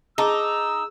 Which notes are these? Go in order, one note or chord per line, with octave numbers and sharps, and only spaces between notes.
D#4 G#4 D#5 A5 D6 E6